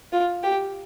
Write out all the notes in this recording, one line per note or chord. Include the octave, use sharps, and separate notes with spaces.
F4
G4